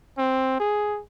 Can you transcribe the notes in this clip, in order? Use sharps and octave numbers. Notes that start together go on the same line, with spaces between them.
C4
G#4